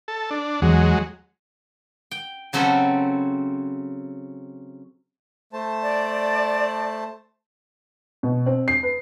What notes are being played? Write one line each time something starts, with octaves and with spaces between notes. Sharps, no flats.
A4
D4
E2 F#3 G#3
G5
C#3 F#3 C4 C#4 A4 B4
A3 C5 A5
D5
B2
C4
C7
B4